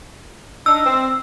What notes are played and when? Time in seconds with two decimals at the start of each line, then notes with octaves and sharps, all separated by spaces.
0.66 D4 D#4 E6
0.85 C4